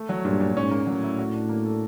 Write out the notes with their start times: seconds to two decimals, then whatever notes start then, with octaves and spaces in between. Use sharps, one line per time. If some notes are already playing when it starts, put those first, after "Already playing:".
Already playing: A3
0.09 F#3
0.25 G2 A#2
0.40 A#2
0.56 G#2 C#4
0.71 A#3
0.87 A2 F#3
1.03 E4
1.19 F#4
1.34 D4
1.49 A#3
1.65 A4